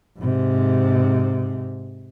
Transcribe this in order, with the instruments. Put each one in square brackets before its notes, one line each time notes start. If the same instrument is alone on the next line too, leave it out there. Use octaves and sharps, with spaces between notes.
[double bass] G#2 C3